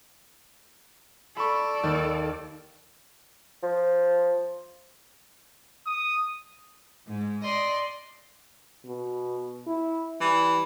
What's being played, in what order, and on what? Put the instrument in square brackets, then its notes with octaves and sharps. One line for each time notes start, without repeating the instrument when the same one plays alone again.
[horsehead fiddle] A4 D5 [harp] B5 C#6
[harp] D#2
[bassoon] F3
[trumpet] D#6
[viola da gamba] G#2
[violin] D5 C6 [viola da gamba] D#5
[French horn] B2
E4
[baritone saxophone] E3 [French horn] G3